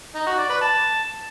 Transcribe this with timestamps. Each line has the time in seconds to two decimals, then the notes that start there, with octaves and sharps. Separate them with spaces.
0.15 D#4
0.27 F#4
0.38 D5
0.50 B4
0.61 A5